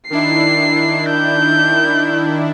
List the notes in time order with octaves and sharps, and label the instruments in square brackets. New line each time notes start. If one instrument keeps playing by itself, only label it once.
[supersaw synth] D#3 D4 E4 [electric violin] C7
[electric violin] G6